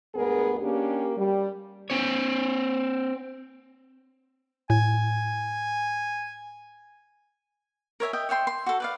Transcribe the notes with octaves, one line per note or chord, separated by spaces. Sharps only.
D2 G2 G#3 B3 G#4 A#4
A#3 C#4 D4 G4
G3
C4 C#5
A2 G#5
A#4 C#5 E5 G#5
D#5 E5 G5
C#5 E5 G5 C6
C6
F#4 A4
B4 D5 F5